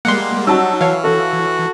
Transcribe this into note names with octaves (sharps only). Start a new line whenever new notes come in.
G3 G#3 A#3 F#5 C6
F#3 G3 D#4 F#4 A5 E6
E3 C#5 F5
F#4 A4